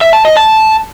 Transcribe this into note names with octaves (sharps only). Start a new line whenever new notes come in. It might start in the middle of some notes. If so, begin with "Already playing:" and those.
E5
A5
D#5
A5